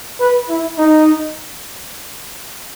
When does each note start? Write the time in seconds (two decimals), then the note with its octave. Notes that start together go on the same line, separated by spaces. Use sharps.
0.20 B4
0.49 E4
0.78 D#4